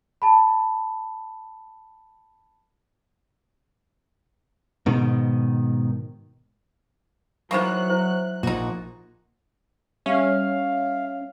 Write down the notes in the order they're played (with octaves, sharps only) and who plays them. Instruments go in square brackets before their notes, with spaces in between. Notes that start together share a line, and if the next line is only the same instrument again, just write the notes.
[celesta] A5 B5
[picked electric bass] G#2 B2 D#3
[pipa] D#3 E3 A#3 [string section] F#3 F#6 [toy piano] C5 C#6
[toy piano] E4 C5
[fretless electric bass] A#1 A#2 [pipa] D#4 F#4
[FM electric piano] G3 C#5 E5 [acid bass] C#4 [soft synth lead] F5